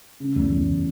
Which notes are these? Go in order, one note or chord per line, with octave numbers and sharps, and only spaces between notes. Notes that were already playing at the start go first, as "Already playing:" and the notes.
C#3
E2
E2